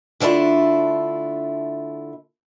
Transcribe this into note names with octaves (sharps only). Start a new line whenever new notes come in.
D3 A3 D4 E4 F4